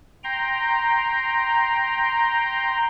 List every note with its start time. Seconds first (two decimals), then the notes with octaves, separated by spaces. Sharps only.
0.24 G5 A#5 C6